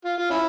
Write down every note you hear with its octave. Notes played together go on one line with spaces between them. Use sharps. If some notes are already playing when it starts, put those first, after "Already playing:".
F4
F4
C#4 E4